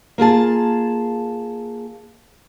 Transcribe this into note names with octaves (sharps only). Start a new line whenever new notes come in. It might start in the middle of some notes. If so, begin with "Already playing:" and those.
A#3 F4 G#4 A5